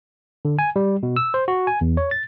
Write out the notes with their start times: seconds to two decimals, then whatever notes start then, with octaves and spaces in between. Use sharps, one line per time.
0.45 D3
0.59 G#5
0.76 G3
1.03 B2
1.16 E6
1.34 C5
1.48 F#4
1.67 G#5
1.81 E2
1.97 C#5
2.11 A6